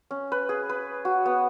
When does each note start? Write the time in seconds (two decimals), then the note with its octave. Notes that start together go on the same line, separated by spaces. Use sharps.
0.11 C#4
0.32 B4
0.49 G#4
0.69 B4
1.05 F#4
1.25 B3